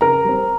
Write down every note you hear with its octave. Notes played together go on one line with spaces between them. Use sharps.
C#3 A#4 A#5
G3 C4